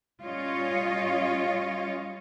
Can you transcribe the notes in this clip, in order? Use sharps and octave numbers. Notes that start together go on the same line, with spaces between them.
G3 C#4 F4 C#5 D#5